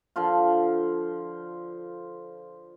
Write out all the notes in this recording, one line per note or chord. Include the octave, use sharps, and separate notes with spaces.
D3 F3 F4